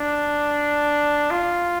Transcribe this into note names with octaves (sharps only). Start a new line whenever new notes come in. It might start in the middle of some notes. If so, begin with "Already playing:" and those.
Already playing: D4
F4